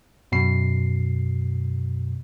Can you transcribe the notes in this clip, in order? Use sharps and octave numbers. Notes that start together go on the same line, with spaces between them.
F#2 B2 C7